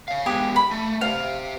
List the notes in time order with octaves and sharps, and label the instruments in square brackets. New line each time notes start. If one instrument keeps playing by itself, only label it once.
[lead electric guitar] C#5 F5
[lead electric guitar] G#3 B3 [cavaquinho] G4 G#5 D#6
[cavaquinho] B5
[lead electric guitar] A3
[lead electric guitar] G4 C5 [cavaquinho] F5